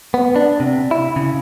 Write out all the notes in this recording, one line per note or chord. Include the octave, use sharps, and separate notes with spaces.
B3
D4
C3
E4
C#3